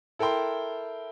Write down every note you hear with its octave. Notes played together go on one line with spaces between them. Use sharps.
E4 A4 A#4 G5 C6